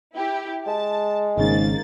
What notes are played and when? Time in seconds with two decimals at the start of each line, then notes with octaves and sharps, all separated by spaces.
0.15 E4 G4
0.67 G#3 A5
1.38 G#1 G#2 C#3 A#3 A6